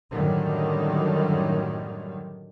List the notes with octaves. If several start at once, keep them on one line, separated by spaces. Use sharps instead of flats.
F#2 A2 D3 D#3 G3